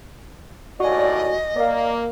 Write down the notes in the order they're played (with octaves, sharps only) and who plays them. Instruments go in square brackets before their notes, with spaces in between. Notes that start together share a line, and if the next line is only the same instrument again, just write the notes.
[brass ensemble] D#2 A2 D5 [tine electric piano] F#4 G#5 [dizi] D#5
[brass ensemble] A#3 [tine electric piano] D5 F5